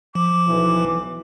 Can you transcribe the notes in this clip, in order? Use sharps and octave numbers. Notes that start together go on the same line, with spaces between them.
F3 D6
B1 E3